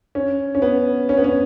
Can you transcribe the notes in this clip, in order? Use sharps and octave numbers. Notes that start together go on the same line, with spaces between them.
C#4
C#4
B3
C#4
B3
C#4